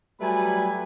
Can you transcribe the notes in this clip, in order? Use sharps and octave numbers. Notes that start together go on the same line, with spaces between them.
F#3 G3 A3 B4 G#5 B5